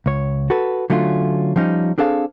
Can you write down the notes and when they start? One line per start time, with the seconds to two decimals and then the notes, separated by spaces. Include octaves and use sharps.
0.06 C#2 C#5
0.50 F#4 A4 B4
0.90 D3 F#3 A3 C#4 F4
1.56 F3 G3 C#4 D#4
1.98 C4 D4 G#4 A4 F5